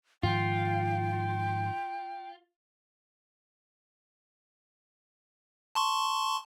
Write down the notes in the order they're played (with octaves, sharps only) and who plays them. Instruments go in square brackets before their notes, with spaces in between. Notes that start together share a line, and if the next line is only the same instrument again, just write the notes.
[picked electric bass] G#2 D#3 F3 [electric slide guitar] F4 [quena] G5
[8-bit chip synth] A5 C6 C#6